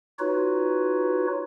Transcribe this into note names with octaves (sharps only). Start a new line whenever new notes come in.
D#4 F4 F#4 B4 C#5